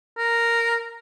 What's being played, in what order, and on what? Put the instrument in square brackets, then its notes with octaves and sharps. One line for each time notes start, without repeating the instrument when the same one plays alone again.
[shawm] A#4